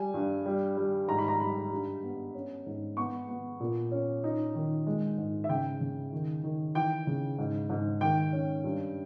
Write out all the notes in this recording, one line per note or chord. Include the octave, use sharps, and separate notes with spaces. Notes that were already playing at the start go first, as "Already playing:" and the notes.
Already playing: G3 G#5
G2
G3
G3
G#2 A#5
B5
A#5
G3 B5
G2
B3
C#4
G#2
B3 C#6
B3
A#2
C#4
D#4
D#3
G#3
G#2
E5
C#3 G5
C#3
D#3
D#3
E3 G5
C#3
G#2
G#2
D#3 G5
C#4
G2